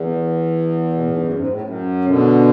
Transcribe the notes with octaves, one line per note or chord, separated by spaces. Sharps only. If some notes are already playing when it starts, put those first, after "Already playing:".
Already playing: E2
B2
A2
G#2
F#2
G#2
A2
F#2
B2 D3